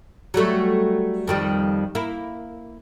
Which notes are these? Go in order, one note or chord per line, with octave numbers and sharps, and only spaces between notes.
F#3 G3 A3
F2 D#3 G3
A#3 E4